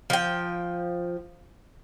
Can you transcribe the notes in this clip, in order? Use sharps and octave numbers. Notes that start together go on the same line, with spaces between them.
F3 G5